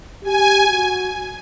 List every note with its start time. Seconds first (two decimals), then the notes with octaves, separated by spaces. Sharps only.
0.23 G4 G#5
0.69 F#4